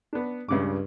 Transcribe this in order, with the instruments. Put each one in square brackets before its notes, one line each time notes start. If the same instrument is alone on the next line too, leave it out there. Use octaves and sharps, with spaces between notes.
[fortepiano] B3 D4
[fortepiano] C#2 C#3 D6 [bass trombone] G2